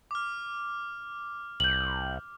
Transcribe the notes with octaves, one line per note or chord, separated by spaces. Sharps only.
D6 F6
C2 G6 F#7